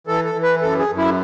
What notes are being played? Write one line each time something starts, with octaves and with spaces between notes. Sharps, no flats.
E3 A4
A4
E3
B4
F#2 A4
G#4
F#2
E4